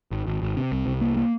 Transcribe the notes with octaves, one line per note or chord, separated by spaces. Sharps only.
G#1
G#1
G#1
C3
C2
C2
A#3
A#3